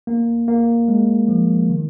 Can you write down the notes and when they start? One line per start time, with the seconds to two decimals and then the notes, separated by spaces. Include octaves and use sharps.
0.07 A#3
0.48 A#3
0.88 G#3
1.28 F3
1.70 D#3